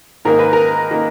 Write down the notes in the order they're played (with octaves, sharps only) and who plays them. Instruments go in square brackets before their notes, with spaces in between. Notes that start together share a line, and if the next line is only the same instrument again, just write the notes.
[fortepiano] G#2 D#3 A#3 A#4
B4
A#4
D#3 A#3